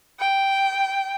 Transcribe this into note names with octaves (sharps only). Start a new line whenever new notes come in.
G5